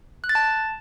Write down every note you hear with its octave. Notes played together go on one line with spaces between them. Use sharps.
F#6
A6
A5